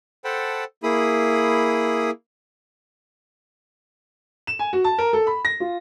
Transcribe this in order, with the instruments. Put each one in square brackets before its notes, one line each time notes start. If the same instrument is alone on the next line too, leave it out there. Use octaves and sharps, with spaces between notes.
[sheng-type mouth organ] A4 C5 F#5 G5 A5 B5
A#3 E4 G#4 B5 D#6
[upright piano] E7
G#5
F#4
A5
A#4
A4
B5
A#6
F4